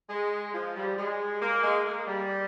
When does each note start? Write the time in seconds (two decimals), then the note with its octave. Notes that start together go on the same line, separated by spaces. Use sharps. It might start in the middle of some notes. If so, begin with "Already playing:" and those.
0.09 G#3
0.53 F3
0.76 G3
0.97 G#3
1.41 A#3
1.63 G#3
1.86 A#3
2.07 G3